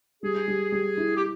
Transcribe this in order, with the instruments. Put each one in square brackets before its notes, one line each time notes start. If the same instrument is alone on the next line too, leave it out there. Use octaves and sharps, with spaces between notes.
[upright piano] G3 [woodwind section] G#4
[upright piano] G3
G3
E4
[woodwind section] G4